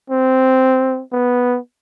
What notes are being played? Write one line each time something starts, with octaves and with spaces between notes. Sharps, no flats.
C4
B3